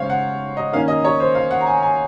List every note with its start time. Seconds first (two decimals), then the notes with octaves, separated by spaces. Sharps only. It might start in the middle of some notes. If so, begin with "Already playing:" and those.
Already playing: C#3 G#3 C#4 C5 C#5 F5
0.10 F#5
0.57 D#5
0.72 D#3 A#3 C#4 F5
0.88 D#5
1.05 C#5
1.20 C5
1.35 F5
1.51 F#5
1.61 A#5
1.67 G#5
1.83 G#5